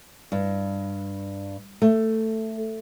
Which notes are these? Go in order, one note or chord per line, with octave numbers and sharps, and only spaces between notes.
G2
A3